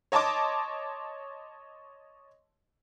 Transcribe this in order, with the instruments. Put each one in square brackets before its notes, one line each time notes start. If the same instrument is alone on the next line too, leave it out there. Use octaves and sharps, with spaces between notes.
[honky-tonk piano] C#5 D#5 A5 C6 D6